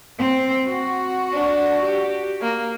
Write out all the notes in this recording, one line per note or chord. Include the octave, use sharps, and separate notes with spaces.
C4
F#4
D4
G4
A#3